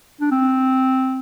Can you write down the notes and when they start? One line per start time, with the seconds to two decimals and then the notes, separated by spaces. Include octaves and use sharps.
0.21 D4
0.31 C4